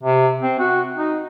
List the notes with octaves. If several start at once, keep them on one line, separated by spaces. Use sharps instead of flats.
C3
C4
F#4
D#4